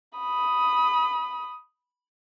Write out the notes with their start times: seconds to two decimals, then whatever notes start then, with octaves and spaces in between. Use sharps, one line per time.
0.18 B5 D#6